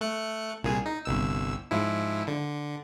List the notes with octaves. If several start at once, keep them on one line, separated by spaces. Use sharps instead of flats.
A3 F#6 C#7
C2 A#2 G#4
D#4
G1 C2 E6
G#2 F3 E4
D3